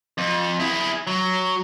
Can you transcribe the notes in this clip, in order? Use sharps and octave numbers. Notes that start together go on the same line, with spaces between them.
F2
E4 G#4
F#3